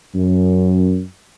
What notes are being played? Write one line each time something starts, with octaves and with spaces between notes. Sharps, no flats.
F#2